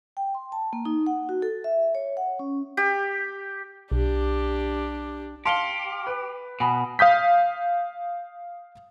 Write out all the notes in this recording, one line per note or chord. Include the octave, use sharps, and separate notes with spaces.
G5
C6
A5
A#3
D#4
F#5
F#4
A4
E5
C#5
F#5
C#4
G4
B1 D4 G4
G4 F5 A5 C6 C#7 G7
B4
B2 G#5 B5 D#6
F5 D#6 G6 B6